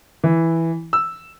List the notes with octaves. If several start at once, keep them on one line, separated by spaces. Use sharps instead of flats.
E3
E6